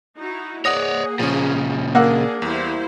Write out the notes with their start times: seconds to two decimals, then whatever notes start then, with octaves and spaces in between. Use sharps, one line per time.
0.18 D#4 E4 F#4
0.65 A#3 G#4 C#5 D5 F#5 D#6 A#6
1.19 A#2 C#3 F3 C#4
1.95 A#3 D4 G#4 F#5 E6
2.42 E2 G3 E4 C5